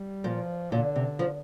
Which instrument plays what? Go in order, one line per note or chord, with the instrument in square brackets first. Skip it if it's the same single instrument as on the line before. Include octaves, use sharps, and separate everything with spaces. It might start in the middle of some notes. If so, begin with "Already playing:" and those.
Already playing: [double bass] G3
[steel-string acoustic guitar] A#2 [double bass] F3
[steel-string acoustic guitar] A#2 [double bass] D3
[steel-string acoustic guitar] C3
F3